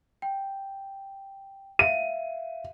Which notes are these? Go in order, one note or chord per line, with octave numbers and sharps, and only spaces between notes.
G5
E5 F5 D#7